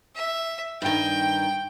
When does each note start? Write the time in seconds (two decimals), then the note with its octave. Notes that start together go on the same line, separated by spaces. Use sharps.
0.15 E5
0.82 G2 D#3 G5